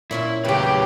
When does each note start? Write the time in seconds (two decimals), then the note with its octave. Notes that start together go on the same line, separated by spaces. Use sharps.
0.11 A#2 C#4 E4 F4
0.44 E2 C#3 F#3 A3 G4 B4 G5